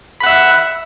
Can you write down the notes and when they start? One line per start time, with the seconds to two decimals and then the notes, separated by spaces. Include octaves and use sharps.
0.21 B5
0.23 F#5
0.26 E5